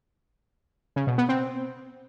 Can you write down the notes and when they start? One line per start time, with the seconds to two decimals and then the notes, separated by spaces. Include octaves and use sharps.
0.96 C#3
1.07 B2
1.18 B3
1.29 C4